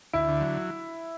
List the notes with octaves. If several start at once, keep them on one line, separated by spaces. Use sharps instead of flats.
D2 E4
D3
F#3